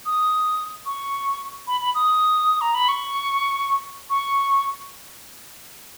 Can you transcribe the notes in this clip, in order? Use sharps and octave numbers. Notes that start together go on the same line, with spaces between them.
D#6
C#6
B5
B5
D#6
A#5
B5
C#6
C#6